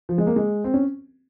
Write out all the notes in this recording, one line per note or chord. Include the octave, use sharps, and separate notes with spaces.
F3
G#3
A#3
G#3
C4
C#4